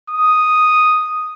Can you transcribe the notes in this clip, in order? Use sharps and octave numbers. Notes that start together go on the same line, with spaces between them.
D#6